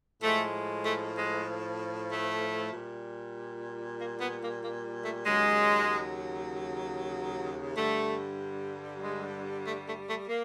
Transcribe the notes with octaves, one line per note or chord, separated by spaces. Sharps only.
A2 F3 G#3 A3
A3
G#3
A3
A#2 G3
A#3
B3
A#3
A#3
A3
D#2 C#3 F#3 G#3
G2 D3 G3 A3
G#3
A3
A3
A3
A#3